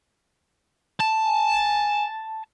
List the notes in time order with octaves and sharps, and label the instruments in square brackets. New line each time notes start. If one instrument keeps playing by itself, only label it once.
[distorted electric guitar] A5
[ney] G#5